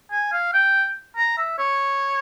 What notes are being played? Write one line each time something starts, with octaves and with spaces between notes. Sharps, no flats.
G#5
F5
G5
A#5
E5
C#5